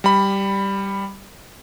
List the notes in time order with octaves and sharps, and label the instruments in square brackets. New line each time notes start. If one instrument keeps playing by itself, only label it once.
[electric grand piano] G3 B5